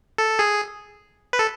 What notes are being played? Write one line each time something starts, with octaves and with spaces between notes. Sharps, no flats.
A4
G#4
B4
A4